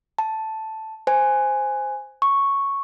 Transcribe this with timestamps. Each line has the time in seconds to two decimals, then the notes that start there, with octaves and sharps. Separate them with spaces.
0.18 A5
1.07 C5 G#5
2.22 C#6